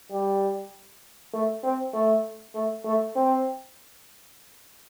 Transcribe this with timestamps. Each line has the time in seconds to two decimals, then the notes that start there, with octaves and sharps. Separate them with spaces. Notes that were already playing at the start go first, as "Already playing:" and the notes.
0.11 G3
1.33 A3
1.63 C4
1.93 A3
2.55 A3
2.85 A3
3.15 C4